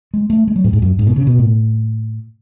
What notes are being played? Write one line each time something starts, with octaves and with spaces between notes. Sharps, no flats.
G#3
A3
G#3
F#3
A2
G#2
F#2
G#2
B2
C#3
B2
A2